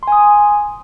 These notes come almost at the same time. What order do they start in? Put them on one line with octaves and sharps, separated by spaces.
C6 G#5 D#6